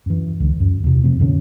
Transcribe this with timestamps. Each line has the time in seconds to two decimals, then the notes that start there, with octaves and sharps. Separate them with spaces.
0.06 F#2 E3
0.40 C#2 D3
0.60 F#2
0.84 E2 C3
1.04 C3 F3 A3 C4
1.20 F2 A#2 D3 C#4